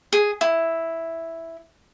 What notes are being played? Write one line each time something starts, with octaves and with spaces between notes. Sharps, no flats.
G#4
E4